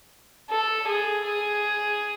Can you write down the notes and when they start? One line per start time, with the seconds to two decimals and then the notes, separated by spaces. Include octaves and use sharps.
0.50 A4
0.88 G#4
1.25 G#4